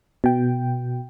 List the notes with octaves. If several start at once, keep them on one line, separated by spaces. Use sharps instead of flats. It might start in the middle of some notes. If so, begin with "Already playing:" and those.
B2 G5